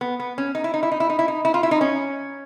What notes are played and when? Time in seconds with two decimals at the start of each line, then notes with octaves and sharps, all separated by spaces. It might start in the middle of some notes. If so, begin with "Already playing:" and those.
0.01 B3
0.20 B3
0.38 C#4
0.55 D#4
0.64 E4
0.74 D#4
0.83 E4
0.92 D#4
1.00 E4
1.10 D#4
1.19 E4
1.28 D#4
1.45 E4
1.54 F4
1.63 E4
1.71 D#4
1.81 C#4